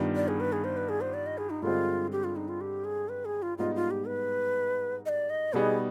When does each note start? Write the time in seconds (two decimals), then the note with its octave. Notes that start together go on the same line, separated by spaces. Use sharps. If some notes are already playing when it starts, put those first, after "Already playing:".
Already playing: G2 D#3 B3 D4 F4
0.16 D5
0.28 G#4
0.40 B4
0.52 G#4
0.64 C5
0.77 B4
0.89 G#4
1.01 C5
1.14 D5
1.26 D#5
1.38 G#4
1.50 D#4
1.62 G2 D3 G#3 C4 F4
2.12 G4
2.24 F4
2.36 D#4
2.49 F4
2.61 G4
2.85 G#4
3.09 B4
3.25 G#4
3.42 F4
3.58 G#2 G3 B3 D#4 F4
3.75 F4
3.91 G4
4.07 B4
5.06 D#5
5.09 D5
5.30 D#5
5.53 B2 G3 B3 D#4 G#4